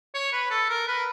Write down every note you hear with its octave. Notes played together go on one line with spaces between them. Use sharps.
C#5
B4
A4
A#4
B4